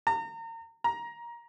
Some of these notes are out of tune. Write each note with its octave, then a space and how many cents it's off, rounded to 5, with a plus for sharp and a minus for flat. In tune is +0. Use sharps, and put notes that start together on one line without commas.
A#5 -35
A#5 +20